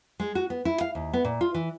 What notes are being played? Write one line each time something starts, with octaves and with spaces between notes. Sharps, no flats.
G#3
F#4
B3
E4
F5
D#2
B3
A#2
F4
E3